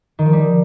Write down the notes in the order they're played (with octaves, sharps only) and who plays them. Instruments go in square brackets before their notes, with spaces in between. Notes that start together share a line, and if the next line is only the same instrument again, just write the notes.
[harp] D#3
F3
G3